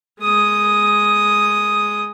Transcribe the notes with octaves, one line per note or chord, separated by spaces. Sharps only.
G#3 D#6